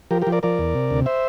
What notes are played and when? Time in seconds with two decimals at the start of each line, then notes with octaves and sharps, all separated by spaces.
0.11 F3 G4 A#4
0.22 G4 A#4
0.27 F3
0.32 A#4 D5
0.43 F3 A#4 D5
0.59 E2
0.74 C3
0.90 D2
1.06 C5 E5